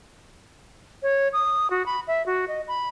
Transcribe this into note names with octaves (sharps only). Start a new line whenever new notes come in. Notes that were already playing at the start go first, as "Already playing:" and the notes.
C#5
D#6
F#4
B5
E5
F#4
D#5
B5